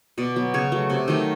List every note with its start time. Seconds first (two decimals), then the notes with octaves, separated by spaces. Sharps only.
0.18 B2 D5
0.36 F#3 B3
0.54 C#3 C#5
0.72 F#3 A3
0.90 C3
1.08 D#3 F#3 A3